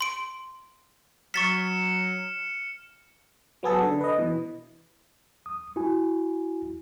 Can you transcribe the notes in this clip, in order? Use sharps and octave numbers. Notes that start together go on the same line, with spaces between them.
C6 D7
F#3 C#6 F6 A6 B6 C#7 E7
F#3 B3 G#4 A4
D3
B4 D#5
B2 E3
D#6
E4 F#4 G#5